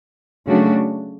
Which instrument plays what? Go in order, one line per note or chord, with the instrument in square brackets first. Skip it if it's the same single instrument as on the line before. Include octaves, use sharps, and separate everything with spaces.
[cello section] C#3 F#3 A3 D4 F#4